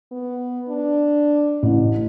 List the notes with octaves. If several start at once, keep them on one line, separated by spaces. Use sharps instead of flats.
B3
D4
A1